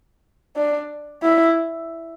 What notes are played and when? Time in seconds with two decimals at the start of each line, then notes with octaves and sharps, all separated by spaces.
0.57 D4
1.23 E4